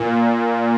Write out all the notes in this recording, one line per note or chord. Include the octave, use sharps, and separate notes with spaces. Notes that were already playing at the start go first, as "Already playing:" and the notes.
Already playing: A#2